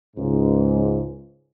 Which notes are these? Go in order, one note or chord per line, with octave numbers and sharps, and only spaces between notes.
C#2 G#2